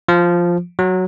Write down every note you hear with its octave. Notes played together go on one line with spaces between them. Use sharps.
F3
F#3